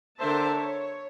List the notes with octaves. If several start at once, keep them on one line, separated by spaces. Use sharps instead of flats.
D3 A#4 C5 E5 A5
C#5